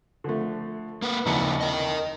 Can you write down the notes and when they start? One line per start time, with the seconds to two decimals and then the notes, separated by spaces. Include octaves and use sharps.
0.24 D3 F3 A3
1.02 A#3 B4
1.26 F1 D#2 C#3 D#4 E4 C#7
1.61 A#4 D#5